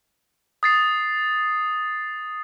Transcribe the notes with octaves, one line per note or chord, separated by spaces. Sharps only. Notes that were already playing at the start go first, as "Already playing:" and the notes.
D#6 A6 C7